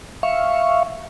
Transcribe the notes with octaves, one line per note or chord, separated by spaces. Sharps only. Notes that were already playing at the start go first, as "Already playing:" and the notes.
E5 F5 C#6